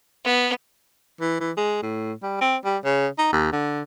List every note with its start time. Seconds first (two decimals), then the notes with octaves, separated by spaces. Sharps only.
0.25 B3
1.20 E3
1.40 E3
1.57 G#3
1.82 A2
2.22 G3
2.41 C4
2.64 G3
2.84 C#3
3.18 D#4
3.32 D#2
3.52 D3